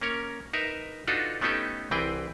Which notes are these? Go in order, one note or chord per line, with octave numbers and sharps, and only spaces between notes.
A#3 C#4 A#4 C#5
D#4 A#4 B4 E5
D4 D#4 F4 F#4 A4 B4
A3 B3 C#4 D#4 G4 A4
C2 E3 C4 G#4 B4 G5